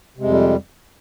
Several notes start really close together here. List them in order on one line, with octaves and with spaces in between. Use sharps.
C3 G#3 F2 G3